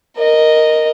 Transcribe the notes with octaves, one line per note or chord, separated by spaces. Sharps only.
A#4 D#5